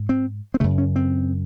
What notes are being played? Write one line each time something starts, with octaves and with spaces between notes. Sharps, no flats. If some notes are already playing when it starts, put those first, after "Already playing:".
Already playing: G#2
C4
C4
F#2 C#3 A3
C#4
C4